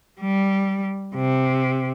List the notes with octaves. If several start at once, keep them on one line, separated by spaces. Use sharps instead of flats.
G3
C3